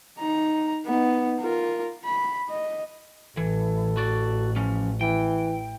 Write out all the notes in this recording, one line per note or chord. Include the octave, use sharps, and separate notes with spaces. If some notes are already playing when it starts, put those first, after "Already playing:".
D#4 A#5
B3 D#4
F4 A#4
B5
D#5
A1 E3 A4
F#4 D5
F3 C#4
E3 G5